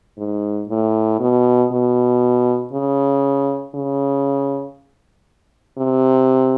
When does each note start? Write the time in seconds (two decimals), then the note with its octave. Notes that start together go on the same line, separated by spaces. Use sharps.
0.18 G#2
0.69 A2
1.20 B2
1.71 B2
2.73 C#3
3.75 C#3
5.78 C3